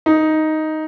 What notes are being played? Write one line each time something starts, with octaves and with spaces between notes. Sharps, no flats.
D#4